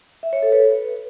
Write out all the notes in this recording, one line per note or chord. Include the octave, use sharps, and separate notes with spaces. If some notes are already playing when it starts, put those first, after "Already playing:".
E5
C#5
A4
B4